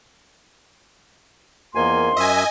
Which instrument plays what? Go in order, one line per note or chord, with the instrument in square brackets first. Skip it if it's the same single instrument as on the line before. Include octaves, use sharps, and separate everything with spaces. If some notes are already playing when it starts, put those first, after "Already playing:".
[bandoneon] E2 A#3 G#5 [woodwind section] D#3 F3 C6
[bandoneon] F#2 E5 [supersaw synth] D#5 G#5